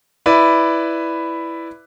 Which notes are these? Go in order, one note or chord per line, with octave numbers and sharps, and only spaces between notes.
E4 B4 D5